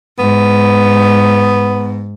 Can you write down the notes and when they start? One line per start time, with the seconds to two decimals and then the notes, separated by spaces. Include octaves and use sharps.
0.19 G#2 B3